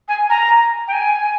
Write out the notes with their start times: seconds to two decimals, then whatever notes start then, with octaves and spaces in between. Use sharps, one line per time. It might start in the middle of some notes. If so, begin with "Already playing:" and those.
0.08 G#5
0.30 A#5
0.88 G5
0.93 G#5